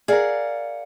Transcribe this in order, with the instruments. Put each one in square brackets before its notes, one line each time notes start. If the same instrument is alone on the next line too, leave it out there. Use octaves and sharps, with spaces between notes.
[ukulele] G#4 A#4 [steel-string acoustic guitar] D5 F5 F#5